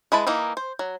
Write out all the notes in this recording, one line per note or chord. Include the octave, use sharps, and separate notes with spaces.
G#3 E4 B4 A5
E3 A#3 D#4 E4
C5
F#3